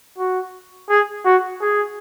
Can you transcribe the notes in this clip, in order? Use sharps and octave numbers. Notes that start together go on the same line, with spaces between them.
F#4
G#4
F#4
G#4